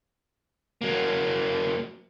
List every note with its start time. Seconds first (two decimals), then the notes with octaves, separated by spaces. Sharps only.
0.81 F#3 A#3